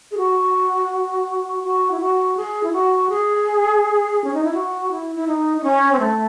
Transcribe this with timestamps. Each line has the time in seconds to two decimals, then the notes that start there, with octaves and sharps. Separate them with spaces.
0.11 G#4
0.18 F#4
1.64 F#4
1.91 E4
2.00 F#4
2.37 G#4
2.63 E4
2.73 F#4
3.09 G#4
4.24 C#4
4.34 D#4
4.44 E4
4.54 F#4
4.91 E4
5.16 E4
5.27 D#4
5.57 D#4
5.64 C#4
5.93 C4
5.99 A3